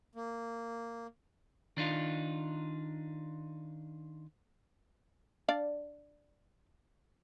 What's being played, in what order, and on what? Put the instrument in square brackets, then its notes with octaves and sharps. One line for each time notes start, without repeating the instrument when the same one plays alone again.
[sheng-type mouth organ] A#3
[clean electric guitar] D#3 D4 D#4 F4
[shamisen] D4 D5 F5